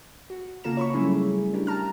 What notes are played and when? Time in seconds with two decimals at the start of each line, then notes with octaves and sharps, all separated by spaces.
0.30 F#4
0.64 C#3 A#3 F4 A4 A#5 E7
0.77 C#5 B5 C#6
0.93 F#3 G3 A3 C#4 E4 G#4
1.53 D4 E4 G4 A#4
1.67 A5 A#5 F6